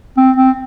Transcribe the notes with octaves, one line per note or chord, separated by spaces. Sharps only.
C4
C4